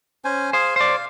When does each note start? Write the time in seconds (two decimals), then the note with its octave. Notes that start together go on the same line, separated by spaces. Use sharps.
0.25 C#4 C5 G#5
0.53 G#4 C5 F5 G#5
0.76 C5 D5 F5